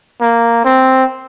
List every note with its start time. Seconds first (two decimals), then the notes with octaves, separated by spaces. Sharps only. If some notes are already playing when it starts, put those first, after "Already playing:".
0.21 A#3
0.65 C4